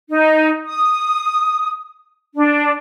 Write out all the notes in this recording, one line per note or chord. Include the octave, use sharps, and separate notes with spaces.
D#4
D#6
D4